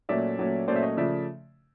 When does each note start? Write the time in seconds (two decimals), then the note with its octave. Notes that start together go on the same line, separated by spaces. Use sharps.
0.09 A#2 F#3 A3 C#4 D5 E5
0.39 A#2 F#3 A3 C#4
0.68 A#2 F#3 A3 C#4 C5 D5
0.76 E5
0.83 C#5 D#5
0.97 C#3 F3 A3 D5 E5